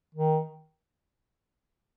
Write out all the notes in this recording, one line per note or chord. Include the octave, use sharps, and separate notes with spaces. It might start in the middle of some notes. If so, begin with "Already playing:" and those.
D#3